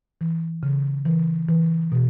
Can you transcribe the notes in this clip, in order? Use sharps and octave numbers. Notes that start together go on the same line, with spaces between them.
E3
C#3
E3
E3
B2